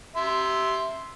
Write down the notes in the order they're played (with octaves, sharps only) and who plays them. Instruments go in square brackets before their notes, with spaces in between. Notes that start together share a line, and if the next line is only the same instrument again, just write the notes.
[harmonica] E5 C6